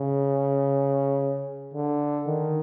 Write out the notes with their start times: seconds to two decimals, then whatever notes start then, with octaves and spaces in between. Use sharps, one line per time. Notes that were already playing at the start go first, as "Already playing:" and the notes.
Already playing: C#3
1.74 D3
2.27 D#3